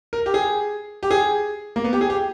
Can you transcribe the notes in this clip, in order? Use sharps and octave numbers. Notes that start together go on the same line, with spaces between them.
A#4
G4
G#4
G4
G#4
A#3
B3
G4
G#4
G4